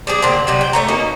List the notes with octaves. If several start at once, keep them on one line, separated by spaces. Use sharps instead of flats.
G3 D4 G#4
A#2 D3 C4
C3 F#3 G3
G5
A3 C#5 A#5
B2 A#3 C#4 D#4